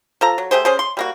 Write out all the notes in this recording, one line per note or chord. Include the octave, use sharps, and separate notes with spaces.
F3 A4 A#5
F#3
A3 G4 G#4 C5
C#4 G#4 C5
C6
G3 A#3 F#4